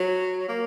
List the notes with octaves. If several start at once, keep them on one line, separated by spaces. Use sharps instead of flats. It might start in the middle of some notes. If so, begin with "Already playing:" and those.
Already playing: F#3
A#3